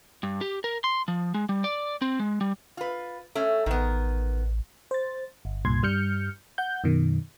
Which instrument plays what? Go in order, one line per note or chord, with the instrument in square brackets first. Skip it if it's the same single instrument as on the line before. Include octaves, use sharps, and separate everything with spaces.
[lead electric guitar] G2
G4
A#4
C6
F3
G#3
G3
D5
C4
G#3
G3
[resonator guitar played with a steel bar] F4 B4
A3 C#4
[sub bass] A1 [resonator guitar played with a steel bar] D#3 B3
[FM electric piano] C5 A6
G1
C2 G2 A#2 C6 G#6
G2 G3 F6 G6 C#7
F#5 G6
F#2 B2 D#3